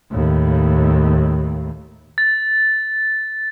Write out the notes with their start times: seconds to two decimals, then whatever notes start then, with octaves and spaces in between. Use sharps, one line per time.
0.13 D#2 A2
2.18 A6